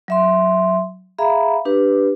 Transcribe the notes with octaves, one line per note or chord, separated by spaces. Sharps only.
F#3 E5 C6
G#4 E5 F5 A#5 B5
D4 G4 B4